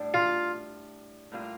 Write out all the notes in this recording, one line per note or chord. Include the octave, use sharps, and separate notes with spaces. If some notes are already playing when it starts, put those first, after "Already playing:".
Already playing: A2 G3 D4
F4
A2 G3 A#3 F4